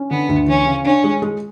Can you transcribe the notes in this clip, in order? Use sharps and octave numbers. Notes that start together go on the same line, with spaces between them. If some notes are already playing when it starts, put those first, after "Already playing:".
Already playing: C#4
D3 B3
D2
E3 C#4
C#3
C#4 D4
G#3
G#3